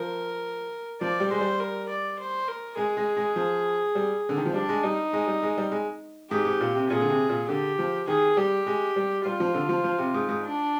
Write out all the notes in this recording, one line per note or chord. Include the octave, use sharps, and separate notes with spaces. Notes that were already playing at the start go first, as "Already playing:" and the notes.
Already playing: F3 A#4
F3 D5
G3
G#3 C5
G3
A#4
D5
C5
A#4
G#3 G#4
G#3
G#3
F3
G3
D3
D#3
F3
G3 D4
G#3
G3 D#4
G#3
G3
G#3
G3
G#3
G#2 G4
G#2
A#2
C3
A#2 G#4
D3
C3
A#2
D3 G4
F3
D#3 G#4
G3 G4
G#3
G3
G3 F4
F3
D3
F3
F3
C3
G#2
G#2
D4